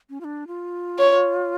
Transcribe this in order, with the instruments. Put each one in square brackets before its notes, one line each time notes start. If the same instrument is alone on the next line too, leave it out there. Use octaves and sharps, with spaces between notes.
[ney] C#4
F4
D4
F4
[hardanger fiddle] C#5